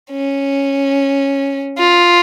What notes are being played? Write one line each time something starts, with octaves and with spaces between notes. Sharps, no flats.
C#4
F4